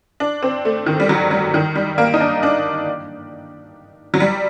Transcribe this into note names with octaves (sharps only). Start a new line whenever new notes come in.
D4
C4
A3
D#3
G3
F#3
G3
D#3
G3
A#3
D#4
D4
D4
F#3
G3